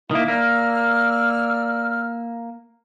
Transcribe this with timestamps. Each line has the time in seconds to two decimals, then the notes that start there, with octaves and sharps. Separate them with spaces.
0.11 D#3 A#3 E4 E5
0.28 A#3 D5 E6 F6